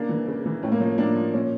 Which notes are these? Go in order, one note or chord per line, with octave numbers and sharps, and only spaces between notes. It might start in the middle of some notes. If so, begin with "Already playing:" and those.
Already playing: C#3 A#3 D4
E3
C#3
E3
A2 C#4
A#3
F3 C#4
A2 A#3 D4
F3
A#2 C#4